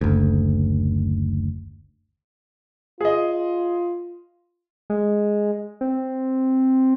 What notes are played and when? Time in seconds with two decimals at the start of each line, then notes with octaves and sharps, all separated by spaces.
0.01 F#1 D2
3.01 F4 G#4 D#5
4.90 G#3
5.81 C4